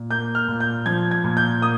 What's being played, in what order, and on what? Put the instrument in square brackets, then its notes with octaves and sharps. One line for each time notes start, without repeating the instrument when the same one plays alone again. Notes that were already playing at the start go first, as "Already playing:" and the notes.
Already playing: [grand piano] A#2
A#3 G6
F6
A#2
G6
F3 G#6
G#6
A#2
G6
A#3 D#6